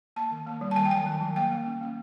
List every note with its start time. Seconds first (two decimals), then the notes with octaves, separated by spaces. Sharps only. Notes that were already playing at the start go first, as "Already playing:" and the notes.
0.16 A#3 A5
0.31 D#3
0.47 A#3
0.61 G3
0.71 A5
0.76 D#3 G#5
0.85 G5
0.91 F#3 G#5
1.06 D#3
1.21 F#3
1.36 A#3 G5
1.51 A#3
1.66 C#4
1.81 A#3